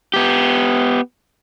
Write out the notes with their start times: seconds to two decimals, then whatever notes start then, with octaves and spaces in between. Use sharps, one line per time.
0.14 B3 G4